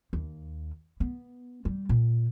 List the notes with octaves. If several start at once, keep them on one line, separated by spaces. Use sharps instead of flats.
D#2
B3
G3
A#2